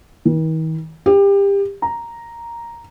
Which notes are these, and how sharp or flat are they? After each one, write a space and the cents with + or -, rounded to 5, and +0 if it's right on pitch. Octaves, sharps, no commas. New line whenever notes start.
D#3 +45
G4 +25
A#5 +0